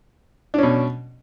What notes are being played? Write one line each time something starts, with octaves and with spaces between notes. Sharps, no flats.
B2 C#4 D4